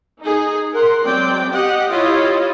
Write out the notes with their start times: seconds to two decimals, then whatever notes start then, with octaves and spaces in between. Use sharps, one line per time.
0.20 D#4 G#4
0.72 A#4 F#5 C6
1.03 F#3 G#3 C4 D5 G5
1.49 G4 D#5 F#5
1.90 E4 F4 G4 C#5 D#5 F5